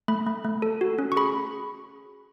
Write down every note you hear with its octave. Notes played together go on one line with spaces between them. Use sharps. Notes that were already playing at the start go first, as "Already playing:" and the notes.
A3 B5
A3
A3
A4
F#4
C#4
C#6
G#4 B5